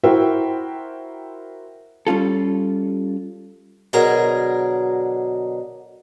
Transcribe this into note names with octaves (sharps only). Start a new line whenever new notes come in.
E4 F#4 A#4 C5 E5 G5
G3 C#4 F4 A4
B2 D3 F#3 G#4 A#4 A#5